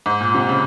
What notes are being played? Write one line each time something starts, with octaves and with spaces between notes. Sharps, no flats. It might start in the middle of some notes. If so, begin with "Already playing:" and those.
G#2
A#2
C3
C#3